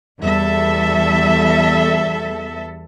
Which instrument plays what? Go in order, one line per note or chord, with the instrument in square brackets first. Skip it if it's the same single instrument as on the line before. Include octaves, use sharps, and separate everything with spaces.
[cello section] E2 G3 A4 E5